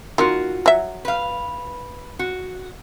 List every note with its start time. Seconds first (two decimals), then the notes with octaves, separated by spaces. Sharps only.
0.18 D#3 A#3 F4 F#4
0.66 F#3 E5
1.05 B4 F5
2.19 F#4